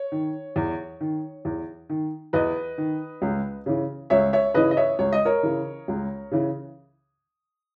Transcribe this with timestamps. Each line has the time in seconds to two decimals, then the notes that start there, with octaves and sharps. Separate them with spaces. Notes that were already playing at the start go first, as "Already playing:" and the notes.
Already playing: C#5
0.12 D#3
0.56 E2
1.01 D#3
1.45 E2
1.89 D#3
2.33 E2 B4 D#5
2.78 D#3
3.22 C#2
3.66 C#3 E3
4.10 C#2 C#5 E5
4.33 C#5 E5
4.54 C#3 E3 B4 D#5
4.71 D#5
4.77 C#5 E5
4.99 C#2 C#5
5.12 D#5
5.25 A#4 C#5
5.43 C#3 E3
5.88 C#2
6.31 C#3 E3